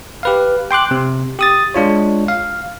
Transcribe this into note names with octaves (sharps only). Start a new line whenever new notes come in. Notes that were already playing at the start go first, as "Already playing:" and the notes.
G4 B4 F5
G5 C6 D6 F#6
C3
G4 D#6 A6
G#3 D4 F4 C#5
F5